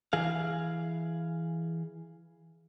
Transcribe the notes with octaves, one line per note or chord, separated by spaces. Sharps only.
E3 G#4 F5